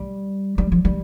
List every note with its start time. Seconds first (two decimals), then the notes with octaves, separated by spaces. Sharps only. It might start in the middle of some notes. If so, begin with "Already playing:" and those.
Already playing: G3
0.58 G3
0.72 F3
0.85 G3